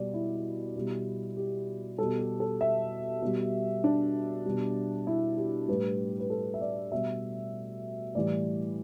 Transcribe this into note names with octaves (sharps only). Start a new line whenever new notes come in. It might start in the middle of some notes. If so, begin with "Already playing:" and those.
Already playing: B2 G3 D5
E4
B2 G3
G4
B2 G3 A4
G4
A4
E5
B2 G3
D4
B2 G3
E4
G4
A2 G3 B4
B4
A4
E5
D5
B2 G3 E5
A2 E3 G3 D5